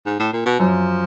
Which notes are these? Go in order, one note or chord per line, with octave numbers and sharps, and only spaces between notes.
G#2
A2
A#2
B2
F#2 F3